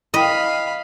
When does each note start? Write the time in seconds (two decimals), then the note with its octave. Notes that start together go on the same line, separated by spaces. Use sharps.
0.14 E4 D#5 F5 G5 B5